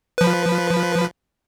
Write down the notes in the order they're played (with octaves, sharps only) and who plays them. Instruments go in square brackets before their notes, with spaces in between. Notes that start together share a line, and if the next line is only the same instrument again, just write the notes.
[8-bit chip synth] F3 B4